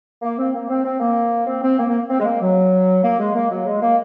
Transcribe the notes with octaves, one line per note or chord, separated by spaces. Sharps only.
A#3
C4
A#3
C4
C4
A#3
C4
C4
A#3
A#3
C4
G#3
A#3
F#3
A#3
G#3
A#3
F#3
G#3
A#3